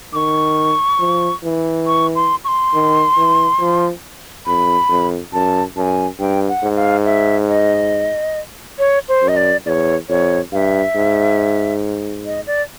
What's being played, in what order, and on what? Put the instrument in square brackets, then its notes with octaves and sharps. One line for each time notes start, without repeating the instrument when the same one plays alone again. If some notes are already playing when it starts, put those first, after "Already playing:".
[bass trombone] D#3 [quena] C#6 D6
[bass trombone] F3
E3
[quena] C#6
C6
C#6
C6
[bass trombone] D#3
E3
F3
[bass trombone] F2 [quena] B5
[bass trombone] F2
[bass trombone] F#2 [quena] A5
[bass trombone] F#2 [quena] A5
[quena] G#5
[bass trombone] G2 [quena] G5
[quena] F#5
[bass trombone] G#2
[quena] F5
E5
D#5
C#5
C5
[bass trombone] F#2
[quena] D#5
D5
[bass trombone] E2 [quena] D5
[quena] C#5
[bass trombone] F2 [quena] C#5
[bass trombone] G2 [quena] F5
[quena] E5
[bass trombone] G#2
[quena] D#5
D5